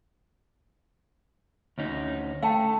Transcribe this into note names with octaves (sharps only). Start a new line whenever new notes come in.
D2 C#4 D#4
A3 F5 G5 A5